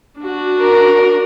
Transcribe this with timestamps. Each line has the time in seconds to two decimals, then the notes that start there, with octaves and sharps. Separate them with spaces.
0.20 D4 F#4
0.59 A#4